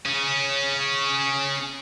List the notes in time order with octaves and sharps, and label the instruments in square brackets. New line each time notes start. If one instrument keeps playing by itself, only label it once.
[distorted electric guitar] C#4 G#4